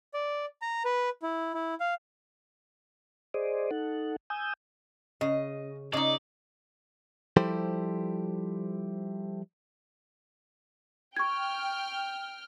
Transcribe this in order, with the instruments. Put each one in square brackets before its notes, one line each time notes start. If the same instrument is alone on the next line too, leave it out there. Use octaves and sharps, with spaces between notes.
[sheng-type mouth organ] D5
A#5
B4
E4
E4
F5
[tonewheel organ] G#4 C5 D5 D#5
D#4 A4 F#5
G#5 D#6 E6 G6
[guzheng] C#3 [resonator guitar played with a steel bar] D#5
[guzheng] C#3 [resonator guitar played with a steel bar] D#4 D#5 [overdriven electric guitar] D5
[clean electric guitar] F3 G3 E4 G4 A4 C5
[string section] G5 F6 [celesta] C#6 G#6